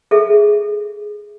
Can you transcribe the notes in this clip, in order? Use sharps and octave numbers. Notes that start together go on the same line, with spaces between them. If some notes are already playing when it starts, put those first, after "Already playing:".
G#4 A4 E5